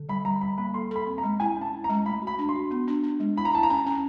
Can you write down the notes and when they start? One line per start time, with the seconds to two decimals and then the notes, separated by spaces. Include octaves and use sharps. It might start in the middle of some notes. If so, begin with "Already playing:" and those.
Already playing: D3
0.09 G3 B5
0.25 G3 A#5
0.41 G3 B5
0.58 A#3 B5
0.74 A4 C6
0.91 A4 B5
1.07 C4
1.18 A#5
1.23 G#3
1.40 E4 G#5
1.57 C#4 A5
1.73 E4
1.84 A#5
1.89 G#3
2.06 A3 B5
2.22 F#4
2.27 B5
2.39 D4
2.49 C6
2.55 F#4
2.71 B3
2.87 D4
3.03 D4
3.20 G#3
3.37 E4 B5
3.45 A#5
3.54 E4 A5
3.63 A#5
3.70 C#4
3.86 C#4